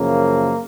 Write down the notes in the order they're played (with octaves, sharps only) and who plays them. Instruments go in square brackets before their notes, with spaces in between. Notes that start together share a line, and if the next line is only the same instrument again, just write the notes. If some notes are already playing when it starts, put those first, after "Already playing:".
Already playing: [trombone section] F#2 C#3 F3 A#3